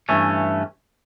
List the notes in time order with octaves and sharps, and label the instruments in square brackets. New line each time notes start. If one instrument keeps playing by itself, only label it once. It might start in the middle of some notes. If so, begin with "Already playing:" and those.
[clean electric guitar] G2 E3 A3 C#4